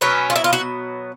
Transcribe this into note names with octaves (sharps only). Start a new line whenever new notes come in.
B2 F#3 B3 C#4
F4
E4
F4
F#4